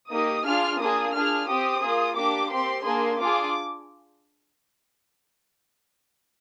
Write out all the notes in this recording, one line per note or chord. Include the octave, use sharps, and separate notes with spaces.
A#3 D#4 G4 D#6
D4 F4 G#4 F6
A#3 D4 F4 G#4 D#6
D4 F4 G#4 F6
C4 G4 D#6
A#3 F4 G#4
A#3 D4 G4 D6
C4 G4 C6
A#3 D4 G#4 C6
D4 F4 G#4 D6